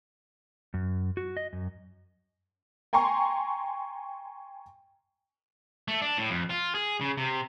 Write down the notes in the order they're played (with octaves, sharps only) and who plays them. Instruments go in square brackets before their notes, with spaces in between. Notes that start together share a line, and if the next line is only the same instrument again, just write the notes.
[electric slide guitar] F#2
F#4
D#5
F#2
[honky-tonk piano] G5 G#5 A#5 C6 C#6
[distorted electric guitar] A3
D4
A2
F2
F4
G#4
C#3
C3